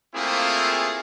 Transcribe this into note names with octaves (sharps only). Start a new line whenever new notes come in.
A3 A#3 C4 E4 F4 G#4